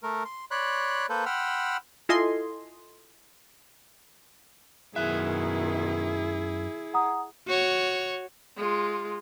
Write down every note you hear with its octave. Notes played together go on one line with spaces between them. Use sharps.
A3 A#4
C6
C#5 D5 B5 C6 F#6
A#3 A4 B4 C5
F#5 G5 B5 C6 E6 F6
E4 F4 A4 D#5 G#5 C6
F#2 B2 D#3 E4 G#4 E5 F#6
F#5 A#5 D#6
F#4 C#5
G#3 F4